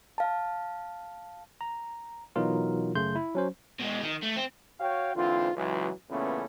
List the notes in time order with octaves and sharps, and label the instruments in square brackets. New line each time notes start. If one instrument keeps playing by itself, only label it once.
[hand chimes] F5 A5
[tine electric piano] A#5
B2 E3 F#3 D#4 F4 A#4
F#2 C#3 A3 C6 G6
E4
F#3 C#4 C5
[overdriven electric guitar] B2 G#3
D#3
A3
C4
[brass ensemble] F#4 C#5 F5 G5
G#2 D3 E3 C4 F4
C#2 E3 F#3
A#2 C#3 E3 A3 B3 C#4